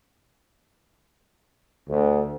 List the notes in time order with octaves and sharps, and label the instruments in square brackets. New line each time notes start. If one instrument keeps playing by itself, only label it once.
[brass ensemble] D2